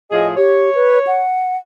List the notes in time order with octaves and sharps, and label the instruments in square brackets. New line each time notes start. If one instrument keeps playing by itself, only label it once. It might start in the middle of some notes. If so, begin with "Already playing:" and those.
[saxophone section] A2 F3 G#4 [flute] D#5
[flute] G4 [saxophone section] C#5
[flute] B4
F#5